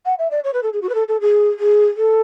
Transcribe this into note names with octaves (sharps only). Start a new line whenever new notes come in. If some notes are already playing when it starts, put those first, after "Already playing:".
F#5
E5
D5
C#5
B4
A4
G#4
F#4
B4
A4
A4
G#4
G#4
A4